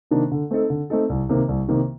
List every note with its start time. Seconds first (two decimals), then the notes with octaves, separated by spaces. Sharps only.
0.11 C3 D#3 A#3 D4
0.32 D3
0.51 A3 C4 D#4 A4
0.70 D3
0.90 A3 C4 D#4 A4
1.10 C2
1.29 C3 D#3 A#3
1.48 C2
1.68 C3 D#3 A#3